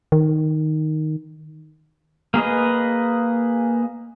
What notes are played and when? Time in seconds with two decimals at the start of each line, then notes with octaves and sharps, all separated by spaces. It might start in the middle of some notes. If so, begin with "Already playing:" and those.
0.12 D#3
2.34 A#3 G#4 B4 D#5